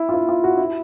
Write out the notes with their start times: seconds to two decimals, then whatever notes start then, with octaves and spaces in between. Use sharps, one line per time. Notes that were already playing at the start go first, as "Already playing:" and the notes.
Already playing: E4
0.09 F4
0.14 E4
0.29 F4
0.44 F#4
0.58 E4